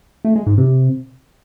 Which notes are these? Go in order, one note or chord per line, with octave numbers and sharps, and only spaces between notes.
A3
G#3
G#2
C3